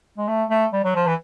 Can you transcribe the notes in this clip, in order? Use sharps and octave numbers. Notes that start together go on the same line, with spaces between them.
G#3
A3
A3
G3
F#3
F3
E3